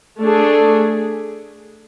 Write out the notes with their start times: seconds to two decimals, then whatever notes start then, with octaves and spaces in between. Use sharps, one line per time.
0.20 A3 D4 G#4